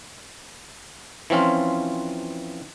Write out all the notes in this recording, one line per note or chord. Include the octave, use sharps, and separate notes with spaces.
E3 F3 C4 C#4 F4